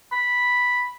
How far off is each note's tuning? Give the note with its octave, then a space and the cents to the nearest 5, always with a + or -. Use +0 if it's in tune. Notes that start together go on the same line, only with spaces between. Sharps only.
B5 -5